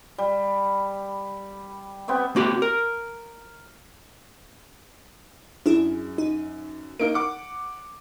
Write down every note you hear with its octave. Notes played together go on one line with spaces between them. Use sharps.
G3
B3 C4 G4 E5
A#3 C4 F#4 G4
A#4
F#2 D4 E4 G#4
D#4
A#3 D#4 A#4 D7
F#5 D6